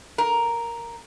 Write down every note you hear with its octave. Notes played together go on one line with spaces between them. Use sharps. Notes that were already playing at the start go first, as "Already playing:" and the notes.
A#4